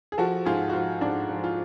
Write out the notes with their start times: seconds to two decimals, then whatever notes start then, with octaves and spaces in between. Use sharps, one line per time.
0.12 G#4
0.18 F3 F#4 A4
0.46 G#2 F4 G#4
0.69 F#4
0.73 F3 F4
1.01 G#2 D4
1.29 F3
1.44 F4